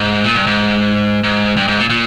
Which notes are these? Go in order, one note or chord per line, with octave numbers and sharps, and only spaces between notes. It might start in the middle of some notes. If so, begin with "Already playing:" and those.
Already playing: G#2
A#2
G2
G#2
G#2
G2
G#2
A#2
A#2